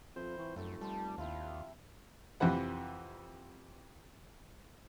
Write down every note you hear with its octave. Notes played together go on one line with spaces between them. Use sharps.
F2 F4 B4 C5 E5
E3 C4 C#6
F1 F#2 A3
G3 A5 C6
D#2 G3 E4 F4 G5
F2 C3 E3 B4 F#5